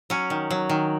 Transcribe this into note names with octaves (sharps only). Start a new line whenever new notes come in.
F#3 C#4
D#3
F#3
D#3